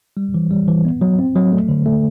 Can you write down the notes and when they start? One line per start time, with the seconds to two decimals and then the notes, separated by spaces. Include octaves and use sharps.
0.17 G3
0.34 E3
0.50 G3
0.68 E3
0.85 B3
1.01 F#3
1.19 C4
1.36 F#3
1.52 A3
1.69 D3
1.86 A3